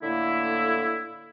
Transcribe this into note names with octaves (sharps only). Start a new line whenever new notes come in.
A2 D3 A#3 E4